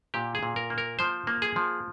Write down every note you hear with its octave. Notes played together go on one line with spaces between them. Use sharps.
A#2 G4
G#4
A#2
A#4
A#3
A#4
F3 C5
A#3
G#4
F3